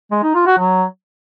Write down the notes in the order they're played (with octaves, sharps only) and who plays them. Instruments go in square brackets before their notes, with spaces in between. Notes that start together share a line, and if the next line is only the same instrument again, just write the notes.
[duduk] G#3
D#4
F4
F#4
F#3